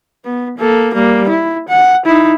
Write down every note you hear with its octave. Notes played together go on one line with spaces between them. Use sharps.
B3
A#3 A4
G3 A#3
E4
F#5
D#4 E4